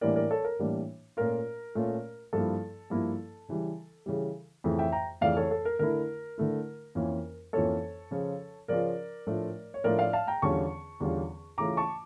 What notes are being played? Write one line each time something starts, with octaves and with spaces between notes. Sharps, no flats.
A2 E3 G3 A#3 D4 A#4 D5
A#4 D5
A4 C#5
A#4
A2 E3 G3 A#3 D4
A#2 A3 C#4 F4 A#4
A#2 A3 C#4 F4
G2 F3 A#3 E4 A4
G2 F3 A#3 E4
C#3 E3 G3
C#3 E3 G3
F2 C#3 E3 A3
E5 G5
G5 A#5
F2 C#3 E3 A3 D5 F5
A4 C#5
A4
A#4
D3 A3 E4 A#4
D3 A3 E4
F2 E3 A#3 C#4 F4
F2 E3 A#3 C#4 F4 A4 C#5
C#3 F3 C#4 F4
C#3 F3 C#4 F4 A#4 D5
A2 F3 A3 D4 F4
C#5
A2 F3 A3 D4 F4 A#4 D5
D5 F5
F5 A5
G5 A#5
E2 D3 G3 C#4 F4 A5 C#6
E2 D3 G3 C#4 F4
C#3 E3 A3 C#4 F4 A#5 D6
A5 C#6